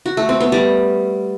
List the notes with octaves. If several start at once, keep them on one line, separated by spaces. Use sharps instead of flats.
F#4
A3
C4
B3
G3